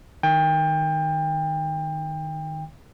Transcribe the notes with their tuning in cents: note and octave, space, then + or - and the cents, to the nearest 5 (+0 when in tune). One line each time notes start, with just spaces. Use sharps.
D#3 -10 G5 +25